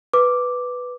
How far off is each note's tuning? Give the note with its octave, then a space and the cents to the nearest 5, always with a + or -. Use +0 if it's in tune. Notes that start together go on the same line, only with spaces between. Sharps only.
B4 +0 D6 +0